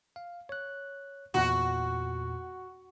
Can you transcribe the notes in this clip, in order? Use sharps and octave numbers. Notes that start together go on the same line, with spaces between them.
F5
C#5 F#6
E2 A#2 F#4